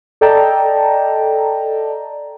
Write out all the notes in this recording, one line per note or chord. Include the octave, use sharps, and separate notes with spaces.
A4 D5 D#5 G5 A5 A#5